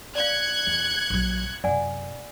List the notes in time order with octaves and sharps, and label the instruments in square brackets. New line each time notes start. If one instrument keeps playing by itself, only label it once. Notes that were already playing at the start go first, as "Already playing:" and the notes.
[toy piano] D5 F5 [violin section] F#6 G#6 C#7
[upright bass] E2
A#1 F#3
[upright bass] F#2 C3 [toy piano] D5 F#5 G#5